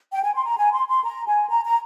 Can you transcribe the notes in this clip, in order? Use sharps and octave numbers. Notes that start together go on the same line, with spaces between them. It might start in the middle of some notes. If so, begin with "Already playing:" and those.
G5
G#5
C6
A#5
G#5
C6
C6
A#5
G#5
A#5
A#5